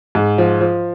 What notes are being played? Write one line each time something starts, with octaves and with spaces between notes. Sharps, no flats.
G#2
F3
F3